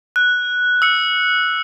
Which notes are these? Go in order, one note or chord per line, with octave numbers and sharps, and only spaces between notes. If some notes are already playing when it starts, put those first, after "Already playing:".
F#6
E6 C#7